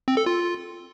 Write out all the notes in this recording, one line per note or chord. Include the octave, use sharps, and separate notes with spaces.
C4
A4
F4